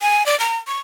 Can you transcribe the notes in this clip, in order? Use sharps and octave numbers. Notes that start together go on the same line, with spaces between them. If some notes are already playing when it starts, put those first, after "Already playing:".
G#5
D5
A#5
C#6